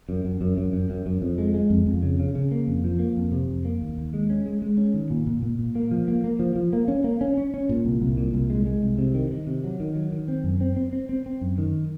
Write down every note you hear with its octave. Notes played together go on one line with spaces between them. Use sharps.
F#2
F#2
F#2
F#2
F#2
F#2
F#2
F2
G#3
G#3
F2
F2
C#3
C#3
C#3
A#3
F2
F3
A#3
F2
C3
F2
A#3
D#2
D#2
G#3
C#4
G#3
G#3
C#4
D#3
A#2
A#2
A#2
A#2
A#3
F3
A#3
A#3
F3
F3
A#3
C#4
A#3
C#4
C#4
C#4
A#2
C2
C2
A#2
C2
G#3
G#3
C2
C3
D#3
D#3
C3
F#3
D#3
F#3
D#3
C4
F#2
C4
C4
C4
C4
C4
F#2
D#3